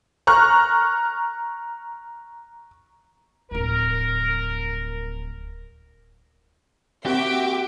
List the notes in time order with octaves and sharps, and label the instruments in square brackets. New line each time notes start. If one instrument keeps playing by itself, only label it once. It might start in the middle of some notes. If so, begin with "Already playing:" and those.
[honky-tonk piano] A#5 C#6 F6 F#6
[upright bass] D1 F2 [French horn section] A#4
[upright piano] A#3 C4 [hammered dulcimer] F#4 [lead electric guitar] G4 [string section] E5 G5 D6